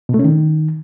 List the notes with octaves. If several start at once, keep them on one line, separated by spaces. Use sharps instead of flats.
B2
A3
C#4
D#3